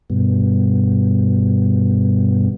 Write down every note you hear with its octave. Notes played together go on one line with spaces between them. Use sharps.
G2 B2